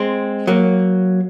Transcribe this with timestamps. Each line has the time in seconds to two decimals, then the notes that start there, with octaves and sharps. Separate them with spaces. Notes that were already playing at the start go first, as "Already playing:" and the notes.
Already playing: G#3 C4
0.47 F#3 A#3